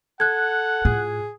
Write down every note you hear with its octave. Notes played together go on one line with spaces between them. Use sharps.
A4 F#5 F#6 G#6
A2 F4 G#4